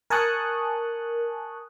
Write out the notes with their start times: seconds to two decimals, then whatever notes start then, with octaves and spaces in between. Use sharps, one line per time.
0.10 A#4 G#5 A5 C#6 D#6 F#6